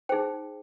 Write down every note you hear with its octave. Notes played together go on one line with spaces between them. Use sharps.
D#4 G#4 C5 G5